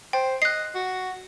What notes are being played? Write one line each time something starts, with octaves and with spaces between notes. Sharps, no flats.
C5 G5
D#5 F#6 C7
F#4